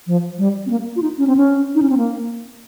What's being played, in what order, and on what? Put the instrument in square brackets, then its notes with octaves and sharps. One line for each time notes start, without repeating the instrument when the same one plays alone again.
[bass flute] F3
G3
C4
A#3
F4
D#4
C#4
C4
C#4
D#4
C#4
C4
A#3